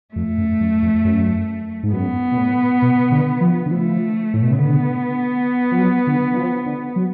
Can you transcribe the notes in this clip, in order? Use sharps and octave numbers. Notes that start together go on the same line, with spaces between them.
F2 A3
F#2
F#2
F2
F#2
G#2
F#2 B3
B2
A2
B2
D3
F3
D3
F3 A3
A2
B2
C#3
D3 B3
F3
F#3
D3
D3
F3
D3
F#3